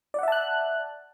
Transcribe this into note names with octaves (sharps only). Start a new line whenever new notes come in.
D5 E5 F#5 A5 F#6